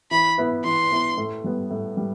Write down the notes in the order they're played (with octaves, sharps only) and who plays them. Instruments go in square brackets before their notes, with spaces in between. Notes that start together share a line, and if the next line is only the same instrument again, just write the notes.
[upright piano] E3 [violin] B5
[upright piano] B3 E4 B4
[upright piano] E3 [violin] C6
[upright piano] B3 E4 B4
A2
G3 B3
A2
G3